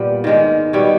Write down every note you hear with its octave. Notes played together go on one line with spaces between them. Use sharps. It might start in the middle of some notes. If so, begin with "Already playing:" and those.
Already playing: A#2 G3 B3
G#2 D#3 G#3
B2 G3 B3 C#5